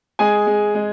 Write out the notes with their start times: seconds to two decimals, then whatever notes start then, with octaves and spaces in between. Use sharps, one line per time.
0.19 G#3 G#4 G#5
0.47 G#3
0.75 G#3